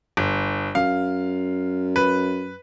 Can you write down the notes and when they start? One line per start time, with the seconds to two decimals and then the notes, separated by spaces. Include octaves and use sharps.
0.17 G1
0.75 F#2 F5
1.96 B4